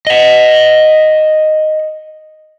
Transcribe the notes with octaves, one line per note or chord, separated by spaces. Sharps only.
D#5 F#5